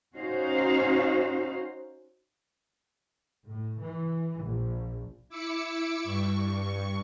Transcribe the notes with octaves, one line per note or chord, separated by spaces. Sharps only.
C#4 D#4 F#4 C5 F5
A2
E3
A#1
E4 D6 E6 C#7
G2 C#6